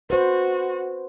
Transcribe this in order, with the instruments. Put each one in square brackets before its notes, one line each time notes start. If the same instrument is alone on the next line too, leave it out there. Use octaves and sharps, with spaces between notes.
[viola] F#4 [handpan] B4 C5